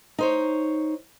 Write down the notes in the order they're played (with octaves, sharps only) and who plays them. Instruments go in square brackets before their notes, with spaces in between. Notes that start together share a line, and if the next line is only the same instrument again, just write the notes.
[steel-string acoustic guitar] D#4 C5 C#5